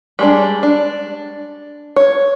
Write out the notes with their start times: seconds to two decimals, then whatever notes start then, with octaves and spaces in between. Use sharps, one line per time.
0.19 G3 G#3 D4
0.63 D4
1.96 C#5